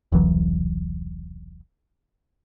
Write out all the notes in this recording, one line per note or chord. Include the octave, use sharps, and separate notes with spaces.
E1 C2 E3 F#3